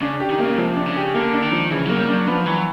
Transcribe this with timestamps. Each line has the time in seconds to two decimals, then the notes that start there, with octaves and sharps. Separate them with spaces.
0.01 C#3 D4
0.20 G4
0.30 D#3
0.39 C#3 A#3
0.58 C3 F3
0.77 D4
0.86 C#3
0.96 G4
1.14 D3 A#3
1.33 D4
1.42 D#3
1.52 F3
1.71 C#3 E3
1.86 F#3 A#3
1.99 G3
2.09 F#3 D4
2.27 F3 B3
2.46 E3 F#3